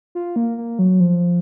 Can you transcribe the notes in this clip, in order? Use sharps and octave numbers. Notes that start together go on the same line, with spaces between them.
F4
A#3
A#3
F#3
F3